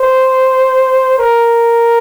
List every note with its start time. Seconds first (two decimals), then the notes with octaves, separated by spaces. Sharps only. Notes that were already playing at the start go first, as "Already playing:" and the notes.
Already playing: C5
1.19 A#4